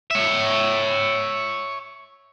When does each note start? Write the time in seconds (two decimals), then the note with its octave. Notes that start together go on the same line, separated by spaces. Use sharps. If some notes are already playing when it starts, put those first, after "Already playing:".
0.11 C#5 E5